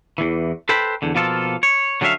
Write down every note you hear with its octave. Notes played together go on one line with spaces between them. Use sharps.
E2 E3
A4 B4 C5 G5 B5
E2 D3
B2 F3 A#3 F4 A4
C#5
D3 F#3 C#4 G4 E5 F5